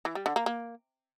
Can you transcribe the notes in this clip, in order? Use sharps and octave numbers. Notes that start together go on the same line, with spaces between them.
E3
G3
D3
A#3
A#3